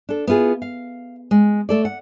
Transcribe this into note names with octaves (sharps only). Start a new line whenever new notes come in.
D4 A4
B3 E4 F4 G#4
F5
G#3
A3 A4 D5
F#5